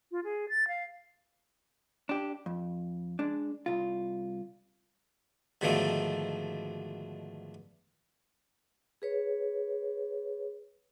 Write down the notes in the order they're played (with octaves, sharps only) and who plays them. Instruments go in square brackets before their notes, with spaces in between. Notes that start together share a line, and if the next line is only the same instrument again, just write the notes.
[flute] F4
G#4
A6
F5
[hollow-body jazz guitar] D4 G4
F2
G#3 D4
C2 F4
[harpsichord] G#2 B2 D3 D#3 F3 A3
[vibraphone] G#4 B4 C#5